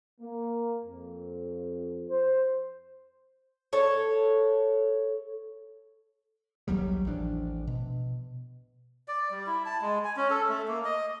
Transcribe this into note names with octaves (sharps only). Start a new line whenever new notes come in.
A#3
F2
C5
A4 C#5
A#1 D#2 F#3 G3
A1 F3 G3 D4
B2
D5
G3
E4
A5
G#3
G#5
C#4
A4
A3
A#3
D#5